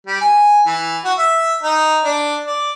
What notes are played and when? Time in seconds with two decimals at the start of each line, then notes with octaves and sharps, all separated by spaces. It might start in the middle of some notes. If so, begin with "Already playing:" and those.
0.07 G3
0.21 G#5
0.66 E3
1.04 F#4
1.18 E5
1.63 D#4
2.04 D4
2.47 D5